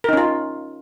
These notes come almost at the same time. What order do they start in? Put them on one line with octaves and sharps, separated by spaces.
A#4 D#4 C#4 F4